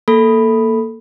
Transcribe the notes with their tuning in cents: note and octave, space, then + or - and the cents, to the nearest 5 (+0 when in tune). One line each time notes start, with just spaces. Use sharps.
A#3 -5 A4 +0 B5 +0